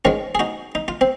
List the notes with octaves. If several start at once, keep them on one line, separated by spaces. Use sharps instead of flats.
G#2 D#3 G#3 C#4 F4
G#4
D#4 F#4
D#4
F4
C4